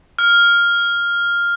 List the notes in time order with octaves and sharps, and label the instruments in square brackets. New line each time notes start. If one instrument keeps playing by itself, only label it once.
[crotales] F6